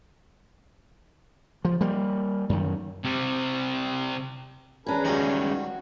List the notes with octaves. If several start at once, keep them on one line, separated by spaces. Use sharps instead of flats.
F3
G3 A#3
F#2 D#3
C3 G3
E2 C#4 D4 G#4 A#4 B4
C#2 G2 D#3 G3 F#4 A#5